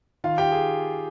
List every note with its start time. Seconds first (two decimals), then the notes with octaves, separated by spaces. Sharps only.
0.24 D#3 F4 F5
0.38 G4 G5
0.52 G#4